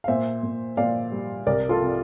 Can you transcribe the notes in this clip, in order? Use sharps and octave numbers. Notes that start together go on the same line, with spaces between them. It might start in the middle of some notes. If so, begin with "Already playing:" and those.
F5
A#2 C5 E5
A#2
A#2 D5 F5
G3
C2 A#4 D5
F4 A4
C3